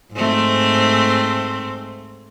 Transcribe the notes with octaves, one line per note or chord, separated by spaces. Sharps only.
G#2 A3 C4